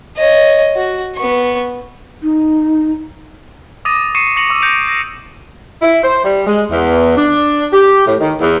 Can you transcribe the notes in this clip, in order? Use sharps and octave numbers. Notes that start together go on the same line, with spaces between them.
C#5 D#5
F#4
B3 C#6
D#4
D6 D#6 A6 A#6 D#7
C#6 C7 C#7 D#7 E7
C#6 A#6 C#7 F7 F#7
C#6 D6 E6
D6 G6 A#6 C#7 D7 F7
A#6 D#7
E4
C5
G3
G#3
E2
D4
G4
A2
D#3
E2